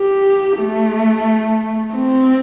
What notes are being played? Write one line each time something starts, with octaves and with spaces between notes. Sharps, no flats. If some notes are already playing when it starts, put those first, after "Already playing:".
Already playing: G4
A3
C4